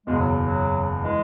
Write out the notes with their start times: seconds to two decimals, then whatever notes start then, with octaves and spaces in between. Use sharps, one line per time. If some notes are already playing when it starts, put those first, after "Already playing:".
0.06 F#1 E2 B2 G#3
0.18 F#3
0.41 F#3
1.01 E3 G#3